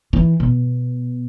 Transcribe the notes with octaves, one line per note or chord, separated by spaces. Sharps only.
E3
B2